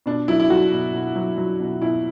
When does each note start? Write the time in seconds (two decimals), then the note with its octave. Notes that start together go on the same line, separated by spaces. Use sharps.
0.06 B2 D4
0.28 F#3 E4
0.40 E4
0.50 F#3 F#4
0.72 B2
0.94 B2
1.16 F#3
1.38 F#3
1.60 B2
1.81 B2 E4